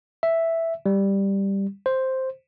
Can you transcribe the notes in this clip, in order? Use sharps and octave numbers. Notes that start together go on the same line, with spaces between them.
E5
G3
C5